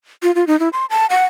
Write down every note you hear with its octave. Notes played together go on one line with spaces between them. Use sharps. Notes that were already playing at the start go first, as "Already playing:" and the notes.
F4
F4
D#4
E4
C6
A5
F#5